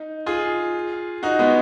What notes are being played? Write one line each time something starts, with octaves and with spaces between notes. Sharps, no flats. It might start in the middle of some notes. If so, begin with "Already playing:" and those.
Already playing: D#4
F4 G#4
D#4 F#4
G#3 B3